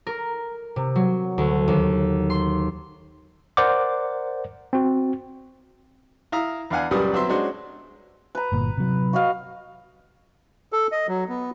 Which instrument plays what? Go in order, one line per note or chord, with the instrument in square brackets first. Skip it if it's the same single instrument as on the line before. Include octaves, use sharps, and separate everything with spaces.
[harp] A#4
C3
F#3
D2
D#2
C6
[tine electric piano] A#4 C5 D5 F#5 D6
C4 F#4
[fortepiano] E4 F5 A#5 D#6
E2 D4 F5 F#5 G#5
C#2 F#2 A#2 G3 B4 D#6
F#3 B3 C4 E5 C6
G#3 C#4 D4 F#4 C5
[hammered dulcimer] B4 A#5
[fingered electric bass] G1 A#2
C3 F#3
[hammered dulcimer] F#4 D#5 F5
[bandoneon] A4
D#5
F#3
B3